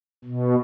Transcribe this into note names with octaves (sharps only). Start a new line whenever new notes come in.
B2